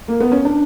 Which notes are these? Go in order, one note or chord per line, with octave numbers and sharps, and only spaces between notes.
A#3
B3
C#4
D4